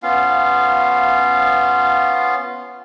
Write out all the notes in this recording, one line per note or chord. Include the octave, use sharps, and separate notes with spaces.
B3 C#4 F4 F5